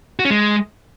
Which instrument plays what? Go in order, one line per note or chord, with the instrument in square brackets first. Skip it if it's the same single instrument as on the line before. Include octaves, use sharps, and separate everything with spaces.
[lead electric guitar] F#4
C#4
G#3